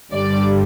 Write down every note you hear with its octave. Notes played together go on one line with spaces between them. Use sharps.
G1 G2 D3 G3 D5